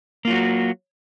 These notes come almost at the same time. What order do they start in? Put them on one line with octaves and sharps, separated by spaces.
A#3 F4 F#3 F#4